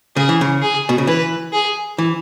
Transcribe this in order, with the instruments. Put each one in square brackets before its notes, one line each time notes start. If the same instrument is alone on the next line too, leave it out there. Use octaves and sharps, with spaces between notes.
[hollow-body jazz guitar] C#3 [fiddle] G#4
[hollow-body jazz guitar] E3
C#3
[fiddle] G#4
[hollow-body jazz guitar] B2
C#3
[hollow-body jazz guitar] E3 [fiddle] B4
[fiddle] G#4
[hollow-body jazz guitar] E3